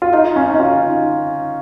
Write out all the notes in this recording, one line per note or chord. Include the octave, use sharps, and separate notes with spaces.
F4
D#4
C#4
D#4
F4